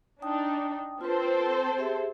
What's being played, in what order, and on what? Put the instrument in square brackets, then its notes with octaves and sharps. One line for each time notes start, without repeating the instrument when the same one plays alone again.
[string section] D4 D#4 [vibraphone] G5 D#6
[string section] C4 A4 C5 [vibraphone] F4 B4
[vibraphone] G4 G#4 E5